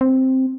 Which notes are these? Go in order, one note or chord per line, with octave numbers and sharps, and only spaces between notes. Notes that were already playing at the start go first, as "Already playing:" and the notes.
C4